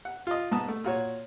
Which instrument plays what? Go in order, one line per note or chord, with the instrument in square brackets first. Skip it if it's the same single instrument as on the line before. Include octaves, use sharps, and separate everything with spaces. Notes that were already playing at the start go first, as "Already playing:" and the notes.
[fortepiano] F#5
F4 D#5
G#2 B3 A5 D#6
A3
A#2 F#4 C#5